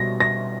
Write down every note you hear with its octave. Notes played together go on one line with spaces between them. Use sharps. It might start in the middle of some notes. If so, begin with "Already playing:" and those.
Already playing: B2 G3 A#6
A#6